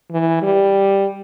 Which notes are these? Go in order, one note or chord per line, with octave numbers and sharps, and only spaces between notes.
E3
G3